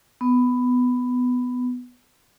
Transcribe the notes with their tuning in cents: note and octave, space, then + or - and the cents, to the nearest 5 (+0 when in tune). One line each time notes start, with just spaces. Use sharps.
B3 +10